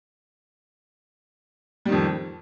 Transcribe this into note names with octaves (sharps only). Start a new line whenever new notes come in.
F2 D#3 G3